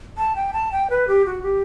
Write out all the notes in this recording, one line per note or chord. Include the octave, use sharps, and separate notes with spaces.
A5
G5
A5
G5
B4
G4
F#4
G4